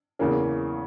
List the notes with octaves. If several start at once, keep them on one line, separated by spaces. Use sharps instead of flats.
E2 C#3 E3 A#3 C#4